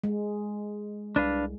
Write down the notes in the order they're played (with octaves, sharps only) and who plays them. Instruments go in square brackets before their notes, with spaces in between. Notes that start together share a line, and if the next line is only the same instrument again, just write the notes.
[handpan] G#3
[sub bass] C2 [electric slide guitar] D4 B4 F5